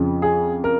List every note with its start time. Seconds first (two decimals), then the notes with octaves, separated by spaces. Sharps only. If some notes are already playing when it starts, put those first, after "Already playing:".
Already playing: F2 C#3 F3
0.22 G#4
0.64 A#4